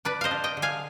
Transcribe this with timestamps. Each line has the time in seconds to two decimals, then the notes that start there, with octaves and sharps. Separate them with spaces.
0.05 D4 B4 D5
0.21 C5 D#5 F5
0.31 D4
0.44 D#5 G5
0.57 D3
0.62 F5 G#5